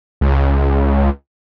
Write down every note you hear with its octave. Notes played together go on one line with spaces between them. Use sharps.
C#2